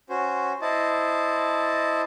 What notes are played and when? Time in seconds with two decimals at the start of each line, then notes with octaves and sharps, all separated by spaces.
0.10 C#4 F#4 C5
0.61 E4 C5 D#5 A5